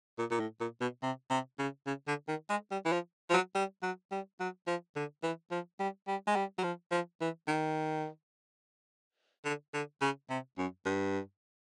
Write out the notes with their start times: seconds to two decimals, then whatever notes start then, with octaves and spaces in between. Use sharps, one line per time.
0.19 A#2
0.31 A#2
0.40 A2
0.61 A#2
0.81 B2
1.03 C3
1.30 C3
1.59 C#3
1.87 C#3
2.07 D3
2.28 D#3
2.50 G#3
2.71 G3
2.85 E3
2.92 F3
3.30 F3
3.34 F#3
3.55 G3
3.83 F#3
4.12 G3
4.40 F#3
4.67 F3
4.96 D3
5.23 E3
5.51 F3
5.79 G3
6.07 G3
6.27 G#3
6.36 G3
6.58 F#3
6.64 F3
6.92 F3
7.21 E3
7.48 D#3
9.45 D3
9.74 D3
10.01 C#3
10.30 C3
10.58 F#2
10.85 G2